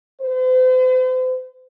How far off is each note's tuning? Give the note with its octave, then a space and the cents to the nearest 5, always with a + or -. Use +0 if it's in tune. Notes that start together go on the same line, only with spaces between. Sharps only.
C5 -40